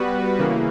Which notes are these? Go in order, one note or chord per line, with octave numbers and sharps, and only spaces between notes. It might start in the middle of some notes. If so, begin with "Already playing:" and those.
Already playing: G3 B3 F#4 B4
C#3 E3 A#3